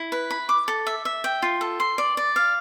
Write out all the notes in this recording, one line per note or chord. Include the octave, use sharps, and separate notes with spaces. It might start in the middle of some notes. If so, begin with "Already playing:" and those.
Already playing: E4
B4
B5
D6
A4
E5
E5
G5
F4
A4
C6
D5
D5
F5